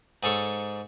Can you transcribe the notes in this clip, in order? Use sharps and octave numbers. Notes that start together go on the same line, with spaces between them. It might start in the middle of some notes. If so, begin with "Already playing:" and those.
G#2 G#4 A4 C#5